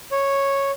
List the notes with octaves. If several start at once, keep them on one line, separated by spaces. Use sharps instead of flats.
C#5